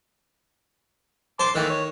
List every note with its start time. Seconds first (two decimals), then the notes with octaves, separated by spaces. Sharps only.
1.40 C5 A5 C6 D6
1.55 D#3 E3 A3 A#3
1.70 C#5